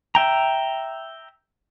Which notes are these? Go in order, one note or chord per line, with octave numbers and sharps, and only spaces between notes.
E5 G5 A#5